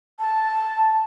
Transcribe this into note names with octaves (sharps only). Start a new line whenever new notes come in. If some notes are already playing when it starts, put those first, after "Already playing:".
A5